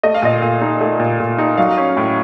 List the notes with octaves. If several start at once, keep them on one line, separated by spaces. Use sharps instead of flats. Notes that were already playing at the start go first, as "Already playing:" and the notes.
A3 D#5
F5
A#2 D#5
A#2
D#4
A3
A#2
A#2
D#4
F#3 F5
C#4
A2